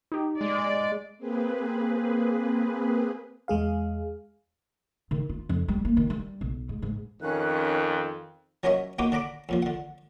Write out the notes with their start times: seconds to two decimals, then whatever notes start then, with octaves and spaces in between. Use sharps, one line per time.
0.12 D#4 G4
0.41 G#3 D5
1.18 A#3 C4 G#4 B4
3.48 E2 G#3 G#4 F5
5.11 D#3
5.29 F4
5.49 F2
5.68 G3
5.85 A#3
5.97 D#3
6.10 G3
6.41 B1
6.69 G#2
6.82 G#2
7.22 F2 D#3 C#4 F#6
8.63 F#3 C#4 A#4 C#5 D#5 E5
8.99 A#3 B3 D#4 F#4 G4 B4
9.12 D3 D4 A#5 B5 D6
9.49 F2 A#2 F3
9.62 D3 F#5